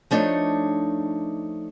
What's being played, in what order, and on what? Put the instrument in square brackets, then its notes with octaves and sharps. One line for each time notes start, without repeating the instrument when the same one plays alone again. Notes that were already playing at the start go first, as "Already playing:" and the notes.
[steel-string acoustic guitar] F3 A3 D4 D#4 C#5